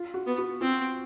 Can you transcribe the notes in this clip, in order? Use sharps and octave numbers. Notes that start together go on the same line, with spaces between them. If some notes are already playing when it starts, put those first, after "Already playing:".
Already playing: F4
F#4
B3
F#4
C4 F4